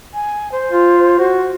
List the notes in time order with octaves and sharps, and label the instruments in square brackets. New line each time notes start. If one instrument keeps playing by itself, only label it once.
[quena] G#5
C5
[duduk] F4
F#4